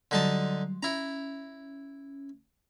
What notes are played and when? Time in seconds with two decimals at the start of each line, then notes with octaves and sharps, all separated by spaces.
0.11 D3 F#3 G3 D#4 A5 C6
0.83 C#4 E4 A#5